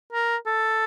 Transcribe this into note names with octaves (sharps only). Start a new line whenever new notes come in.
A#4
A4